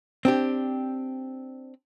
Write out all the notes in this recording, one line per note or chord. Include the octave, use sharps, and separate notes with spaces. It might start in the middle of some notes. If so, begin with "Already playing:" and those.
C4 D4 G4